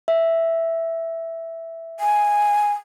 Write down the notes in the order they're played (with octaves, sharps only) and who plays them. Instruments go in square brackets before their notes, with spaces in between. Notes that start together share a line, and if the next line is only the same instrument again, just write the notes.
[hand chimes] E5
[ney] G#5